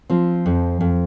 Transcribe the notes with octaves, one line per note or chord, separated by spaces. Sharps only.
F3 C4
F2
F2